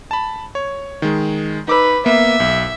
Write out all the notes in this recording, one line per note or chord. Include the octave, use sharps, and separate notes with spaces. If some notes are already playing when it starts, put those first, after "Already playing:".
A5 B5
C#5
D#3 G#3
D#4 B4 D6 E6
A#3 B3 E5
B1